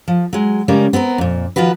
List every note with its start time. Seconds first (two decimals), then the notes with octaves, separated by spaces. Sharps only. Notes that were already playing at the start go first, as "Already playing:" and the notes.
0.08 F3
0.33 F#3 G#3
0.68 C#3 G3 G#3 C#4 A#4 D5
0.93 B3 C4 A4 A#4
1.18 F2 A#2
1.56 D#3 F3 F4 F#4 B4